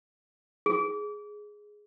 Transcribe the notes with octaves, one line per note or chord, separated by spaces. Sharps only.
G#4